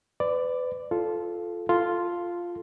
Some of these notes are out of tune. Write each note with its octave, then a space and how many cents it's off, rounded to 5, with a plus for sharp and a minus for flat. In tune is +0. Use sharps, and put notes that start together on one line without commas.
B4 +35 D5 +0
F4 +0 A4 -15
F4 +0 A4 +0